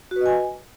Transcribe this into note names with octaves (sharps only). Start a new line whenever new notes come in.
F#4 B4 D#5 G#5